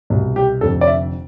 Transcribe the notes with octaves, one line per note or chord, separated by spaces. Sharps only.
C2 B2
G4
F1 F2 D3 A4
D5
E5